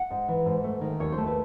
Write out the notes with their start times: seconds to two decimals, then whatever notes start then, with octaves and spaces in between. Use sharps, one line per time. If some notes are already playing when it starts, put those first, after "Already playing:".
Already playing: F#5
0.10 G#2
0.28 E3
0.46 G#2
0.64 A3
0.81 D#3
1.00 D#2 C#5
1.12 C5
1.17 A3
1.27 B4